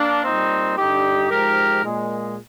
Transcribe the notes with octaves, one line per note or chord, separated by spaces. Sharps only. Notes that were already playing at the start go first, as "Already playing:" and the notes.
Already playing: A#3 D4
A#2 G3 C4 D#4
G2 D3 G3 D#4 G4
G#2 F3 G#3 G4 A#4
A#2 G#3